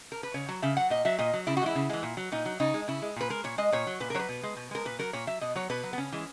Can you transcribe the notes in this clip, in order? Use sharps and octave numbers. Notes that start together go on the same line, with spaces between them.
A#4
B4
C#3 C#5
F#3
C#3 E5
F#3 F#5
A#2 D#5
F#3 E5
A#2 D#5
F#3
C#3 E4
F#4
E3 G#3 E4
C#3
E3 G#3
A#2
F#3
A#2 D#4
F#3
C#3 D#4
G#3
C#3 E4
G#3
A#2 B4
G#3 A#4
A#2 C#5
G#3 D#5
A#2 C#5
F#3
A#2 B4
A#4
F#3 B4 C#5
B2
G#3
B2
G#3 A#4
A#2 B4
F#3 A#4
A#2 C#5
F#3 E5
B2 D#5
F#3 C#5
B2 B4
F#3
B3
C#3 C#4
E3 G#3